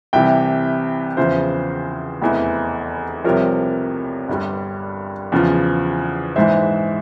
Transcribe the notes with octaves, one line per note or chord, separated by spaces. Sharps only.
C2 C3 E3 E5 G5
E2 C#3 F3 C5 E5
F1 E2 E3
C2 C3 F3 A#4 C#5
G1 G2 G3
E2 C#3 F3
A#1 G#2 E3 C5 E5